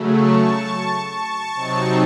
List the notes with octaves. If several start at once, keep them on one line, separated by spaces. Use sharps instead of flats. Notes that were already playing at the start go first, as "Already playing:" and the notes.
Already playing: C#3 F#3 A3
A5 C#6
A5 C#6
C3 F#3 C4 D#4